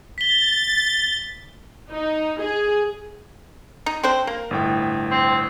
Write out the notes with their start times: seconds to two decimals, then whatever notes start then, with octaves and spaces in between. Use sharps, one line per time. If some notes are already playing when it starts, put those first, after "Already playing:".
0.18 A6 B6 G7
1.90 D#4
2.40 G#4
3.86 D#4
4.04 C4 D4 C5
4.27 A#3 A#4
4.51 G1 A2 G5
5.11 C4